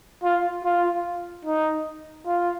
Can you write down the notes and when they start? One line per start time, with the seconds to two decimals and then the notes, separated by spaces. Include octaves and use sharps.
0.24 F4
0.65 F4
1.45 D#4
2.27 F4